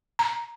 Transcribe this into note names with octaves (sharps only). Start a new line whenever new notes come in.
A#5